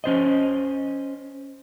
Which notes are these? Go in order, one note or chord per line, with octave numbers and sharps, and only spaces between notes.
C#4 C5 D#5